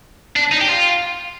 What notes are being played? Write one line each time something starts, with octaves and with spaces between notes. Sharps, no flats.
D4
D#4
G4
F4